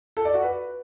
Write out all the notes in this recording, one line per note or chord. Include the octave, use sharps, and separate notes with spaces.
A4
D5
F#4
B4